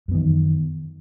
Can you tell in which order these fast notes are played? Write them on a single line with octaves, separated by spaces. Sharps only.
F#2 B3 D#3 E3